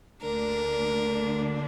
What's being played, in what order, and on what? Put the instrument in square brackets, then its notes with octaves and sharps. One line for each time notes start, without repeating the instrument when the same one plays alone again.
[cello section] D2 D3 A#3 D4 [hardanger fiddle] A#4